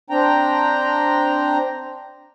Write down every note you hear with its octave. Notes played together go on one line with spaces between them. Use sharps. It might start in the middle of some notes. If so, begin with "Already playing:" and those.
C4 D4 G5 A#5